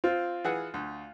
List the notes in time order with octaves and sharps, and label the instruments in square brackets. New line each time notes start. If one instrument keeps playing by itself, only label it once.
[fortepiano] C4 [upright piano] F4
[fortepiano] E3 G#4 F#5
D2